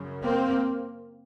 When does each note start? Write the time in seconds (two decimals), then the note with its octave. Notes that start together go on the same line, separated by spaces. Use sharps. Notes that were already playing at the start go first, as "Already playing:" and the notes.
Already playing: F#2 C#3
0.23 A#3 C4